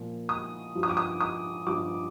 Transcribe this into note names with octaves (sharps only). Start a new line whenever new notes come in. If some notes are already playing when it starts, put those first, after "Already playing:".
Already playing: A#2 F3
D#6
G2 F3
D#6
D6
D#6
D#6
G2 F3 D6